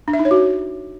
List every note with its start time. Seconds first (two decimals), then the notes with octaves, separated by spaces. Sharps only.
0.08 D4
0.13 E5
0.19 D#4
0.25 C#5
0.31 F#4